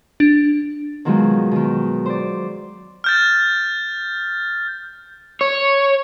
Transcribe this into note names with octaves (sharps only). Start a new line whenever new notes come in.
D4
B2 D#3 F3 F#3 G#3
B2 D#3
C5 D5
F6 G6 A6
C#5